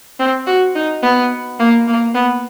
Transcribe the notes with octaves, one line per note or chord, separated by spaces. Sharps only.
C4
F#4
D#4
B3
A#3
A#3
B3